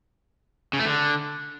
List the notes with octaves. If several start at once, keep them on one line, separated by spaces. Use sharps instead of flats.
C#3
A3
D3